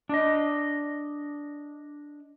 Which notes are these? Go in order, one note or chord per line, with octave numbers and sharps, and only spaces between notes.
D4 D#5